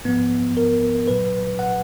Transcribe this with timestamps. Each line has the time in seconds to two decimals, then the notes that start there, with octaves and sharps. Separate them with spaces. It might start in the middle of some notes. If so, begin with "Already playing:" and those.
0.05 G#2 F3 B3
0.57 A#4
1.08 A#2 F#3 B4
1.59 F#5